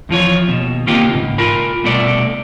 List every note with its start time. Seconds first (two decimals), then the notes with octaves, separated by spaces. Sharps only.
0.09 E2 F3 F4 C#5
0.48 D#2 B2
0.87 C3 D#3 A#3 C4 F4 G4
1.11 C#2 G#2
1.38 F4 A#4 B5
1.83 C2 B2 A3 D5